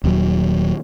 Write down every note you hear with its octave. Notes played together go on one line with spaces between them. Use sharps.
D#1 D#2 F#3